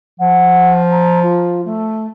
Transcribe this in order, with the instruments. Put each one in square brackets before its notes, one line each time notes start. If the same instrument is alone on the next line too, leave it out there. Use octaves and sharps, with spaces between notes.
[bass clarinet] F3 [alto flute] F#5
[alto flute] A#5
F4
A3